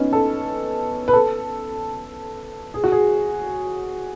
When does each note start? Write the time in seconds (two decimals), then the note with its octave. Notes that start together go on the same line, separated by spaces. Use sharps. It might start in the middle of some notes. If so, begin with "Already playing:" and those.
Already playing: B3 C#4 D#4
0.13 A4
1.08 B4
1.13 A4
2.74 G#4
2.84 F#4
2.92 G#4